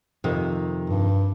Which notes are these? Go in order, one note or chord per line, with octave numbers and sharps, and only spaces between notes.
F2 C3 D#3
G2